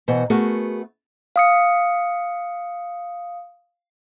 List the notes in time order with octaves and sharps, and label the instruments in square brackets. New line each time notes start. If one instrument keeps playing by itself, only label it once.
[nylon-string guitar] B2 E3 C5 F#5
A3 B3 F#4 G#4 A#4 F#5
[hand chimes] F5 D#6 C#7